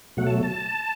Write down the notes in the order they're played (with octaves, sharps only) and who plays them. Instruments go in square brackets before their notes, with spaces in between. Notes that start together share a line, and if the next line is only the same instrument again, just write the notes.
[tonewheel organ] B2 F#3 A3 F#5
A5
A5